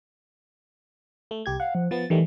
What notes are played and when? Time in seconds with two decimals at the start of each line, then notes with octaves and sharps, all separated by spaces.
1.31 A3
1.46 C2 G4 G#6
1.60 F5 F#5
1.75 F3
1.91 F3 B3 A6
2.10 D#3 E3 G3 A3